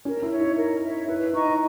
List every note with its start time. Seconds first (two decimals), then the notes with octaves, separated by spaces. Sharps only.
0.05 C#4 A#4
0.23 E4
0.32 C#5 E5
0.40 D#4
0.57 A#4
0.82 C#5 E5
1.08 E4 B4
1.33 D#4 D#5 A#5 C#6